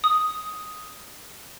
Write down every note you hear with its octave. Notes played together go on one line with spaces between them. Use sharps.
D#6